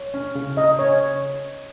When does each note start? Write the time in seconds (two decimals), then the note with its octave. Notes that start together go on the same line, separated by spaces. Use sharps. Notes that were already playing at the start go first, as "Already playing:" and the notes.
Already playing: C#5
0.14 C#4
0.35 C#3
0.57 C#3 D#5
0.79 C#4 C#5